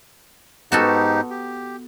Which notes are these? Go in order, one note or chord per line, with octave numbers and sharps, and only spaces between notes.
G#2 B3 D#4 F#4 G4 A4
G4